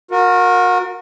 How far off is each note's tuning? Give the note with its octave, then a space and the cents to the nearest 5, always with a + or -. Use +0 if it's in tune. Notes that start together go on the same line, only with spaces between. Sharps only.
F#4 -35 A#4 +0